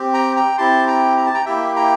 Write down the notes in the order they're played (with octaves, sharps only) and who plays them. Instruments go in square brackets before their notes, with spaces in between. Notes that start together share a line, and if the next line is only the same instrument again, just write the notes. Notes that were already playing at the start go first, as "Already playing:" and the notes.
Already playing: [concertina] C4 G4
G5 A#5
G5 A#5
C4 E4 G4 A5 C6
G5 A#5
A#5
A5
G5 A#5
A#3 E4 G4 E5 G5
G5 A#5